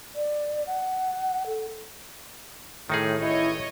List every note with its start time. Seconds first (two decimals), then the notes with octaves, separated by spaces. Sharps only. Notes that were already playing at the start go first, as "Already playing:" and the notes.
0.15 D5
0.67 F#5
1.47 A4
2.90 A2 D#3 D#4 G#4
3.20 A1 E4 C#5 D#5